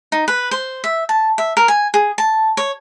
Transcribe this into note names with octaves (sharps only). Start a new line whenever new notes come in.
D#4
B4
C5
E5
A5
E5
A#4
G#5
G#4
A5
C#5